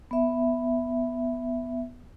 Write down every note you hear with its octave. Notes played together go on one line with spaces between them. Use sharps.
B3 E5